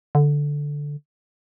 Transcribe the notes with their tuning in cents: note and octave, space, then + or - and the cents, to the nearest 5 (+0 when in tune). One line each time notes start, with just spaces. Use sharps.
D3 -5